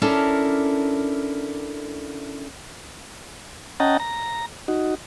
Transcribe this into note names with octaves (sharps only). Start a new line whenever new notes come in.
C#4 D4 E4 A4 A#4
C#4 D#5 F#5 G5 A5 A#5
A#5
D#4 F#4